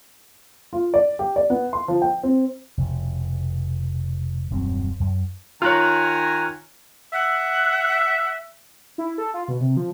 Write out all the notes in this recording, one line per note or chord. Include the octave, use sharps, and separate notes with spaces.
F4
D5
G4
D5
B3
C6
F3
G5
C4
F1 B2 F3
D#1 F#2 F#3 C4
F#2
D#3 F4 C#5 G#5 A#5 F6 F#6
E5 F#5
E4
A4
F4
B2
C3
F3